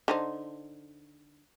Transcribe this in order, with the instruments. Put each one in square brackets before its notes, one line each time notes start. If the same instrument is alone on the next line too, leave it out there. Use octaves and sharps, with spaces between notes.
[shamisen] D3 D#4 C5